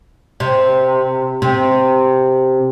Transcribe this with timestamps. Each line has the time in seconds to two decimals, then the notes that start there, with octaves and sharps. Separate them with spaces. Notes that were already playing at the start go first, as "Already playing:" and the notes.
0.40 C3
1.42 C3